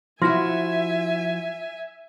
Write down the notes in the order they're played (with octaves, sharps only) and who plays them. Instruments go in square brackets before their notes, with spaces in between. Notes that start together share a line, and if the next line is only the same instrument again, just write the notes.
[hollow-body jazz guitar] F3 E4 F#4 [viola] E5 G#5 [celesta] C6 F6 A#6